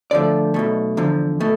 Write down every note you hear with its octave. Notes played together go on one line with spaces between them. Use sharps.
D2 D3 F3 A3 D5
B1 B2 A3
E2 D3 F3
B2 A3